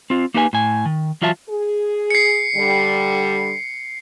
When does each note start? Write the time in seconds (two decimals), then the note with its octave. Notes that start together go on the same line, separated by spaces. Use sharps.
0.10 C4 F4
0.34 A#3 D#4 G4 B4 F5 G#5
0.53 A2 G#5
0.86 D#3
1.22 E3 F#3 F4 E5 A5
1.50 G#4
2.10 C7 C#7
2.55 D3 G3